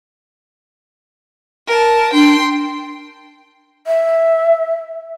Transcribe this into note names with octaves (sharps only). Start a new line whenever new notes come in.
A#4 A5
D4 G5 C6
E5